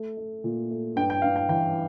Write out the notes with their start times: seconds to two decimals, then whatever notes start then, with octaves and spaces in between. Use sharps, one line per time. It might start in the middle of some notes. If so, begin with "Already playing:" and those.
Already playing: A3
0.17 A3
0.44 A#2
0.70 A3
0.96 G2 G5
1.10 G5
1.22 G2 F5
1.36 G5
1.49 E3 G5